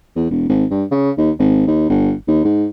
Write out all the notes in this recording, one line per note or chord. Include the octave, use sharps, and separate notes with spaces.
E2
E1
G#1
G2
C#3
D#2
G#1
D#2
G1
D#2
G#2